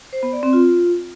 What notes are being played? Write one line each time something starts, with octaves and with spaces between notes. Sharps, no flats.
C5
B3
D5
C4
F4